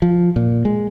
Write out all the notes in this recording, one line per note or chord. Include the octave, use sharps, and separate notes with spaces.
F3
A#2
G#3